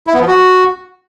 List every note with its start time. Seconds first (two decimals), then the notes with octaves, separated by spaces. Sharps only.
0.07 E4
0.14 B3
0.21 F3
0.28 F#4